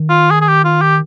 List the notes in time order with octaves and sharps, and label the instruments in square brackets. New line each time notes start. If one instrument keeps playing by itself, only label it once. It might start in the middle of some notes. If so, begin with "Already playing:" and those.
Already playing: [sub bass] D#3
[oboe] F4
G#4
G#4
G4
F4
G4